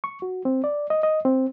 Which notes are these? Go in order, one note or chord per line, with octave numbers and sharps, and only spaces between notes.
C#6
F#4
C4
D5
D#5
D#5
C4